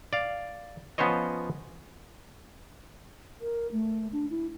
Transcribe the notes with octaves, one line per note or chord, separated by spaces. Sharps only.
D5 F5
F3 B3 C#4 C5 C#5 D#5
A#4
A3
D4
E4